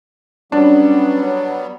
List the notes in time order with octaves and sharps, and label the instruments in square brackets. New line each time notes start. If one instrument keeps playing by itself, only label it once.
[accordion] F#3 G3 B3 [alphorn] C#4 [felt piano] D4
[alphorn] C#5